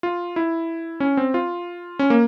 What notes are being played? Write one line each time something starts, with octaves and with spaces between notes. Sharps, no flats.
F4
E4
C#4
C4
F4
C#4
A#3